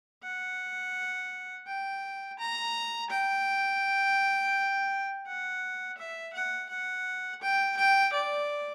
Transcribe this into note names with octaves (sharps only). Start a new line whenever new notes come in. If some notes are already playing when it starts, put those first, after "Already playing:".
F#5
G5
A#5
G5
F#5
E5
F#5
F#5
G5
G5
D5